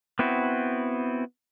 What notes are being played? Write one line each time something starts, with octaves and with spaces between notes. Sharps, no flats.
B3 C4 E4 F#4